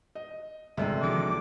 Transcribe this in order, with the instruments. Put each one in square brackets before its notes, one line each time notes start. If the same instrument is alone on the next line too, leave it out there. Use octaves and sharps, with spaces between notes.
[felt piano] D#5
[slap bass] G1 [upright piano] C3 G#3 [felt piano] D4 A4
[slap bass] A#1 D#3 F#3 [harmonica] D6